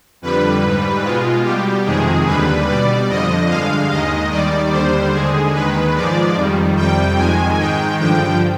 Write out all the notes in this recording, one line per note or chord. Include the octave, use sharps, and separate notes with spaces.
F2 D3 G3 B4
G#2 G3
B2 G#3 F4
B2 G3 G4
F2 C3 D#3 G#3 G#4
D#2 D3 G3 B4
B2 G3 D5
F2 D3 F3 D#5
G2 D3 G#3 F5
D#2 D#3 G#3 D#5
D#2 D#3 G3 D5
D#2 D3 G3 C5
D#2 D3 G#3 G#4
D#2 D#3 G#3 B4
G#2 F3 G#3 D5
F2 D#3 G3
F2 C3 G3 G5
F2 D#3 G#3 G#5
G#2 D#3 G#3 G5
G2 D3 F3 G5